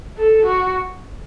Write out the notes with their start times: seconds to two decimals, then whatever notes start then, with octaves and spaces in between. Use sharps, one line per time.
0.17 A4
0.45 F#4